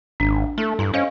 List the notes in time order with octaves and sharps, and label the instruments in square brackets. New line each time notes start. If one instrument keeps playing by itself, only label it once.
[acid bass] G#1 [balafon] D4
[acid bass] A3 [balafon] E4 A4
[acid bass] G2 [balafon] E4 A#5
[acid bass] C#4 [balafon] C5 D#5 F5